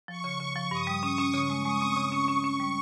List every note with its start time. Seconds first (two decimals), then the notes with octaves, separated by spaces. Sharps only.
0.08 F3 C#6
0.24 C#3
0.40 C#3
0.56 F3
0.71 G2 D#6
0.87 G3
1.02 C#4 C#6
1.18 C#4
1.34 C#3
1.49 G#3
1.65 G#3 D#6
1.81 C4
1.97 C#3 C#6
2.12 C#4
2.28 C#4
2.44 C#4
2.60 G3